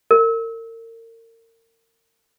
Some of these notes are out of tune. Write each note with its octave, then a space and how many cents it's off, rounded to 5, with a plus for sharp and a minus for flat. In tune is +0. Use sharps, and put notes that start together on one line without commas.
A#4 -35